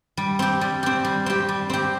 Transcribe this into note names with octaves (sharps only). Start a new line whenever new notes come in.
G3
C4 G4
G3
C4 G4
G3
C4 G4
G3
C4 G4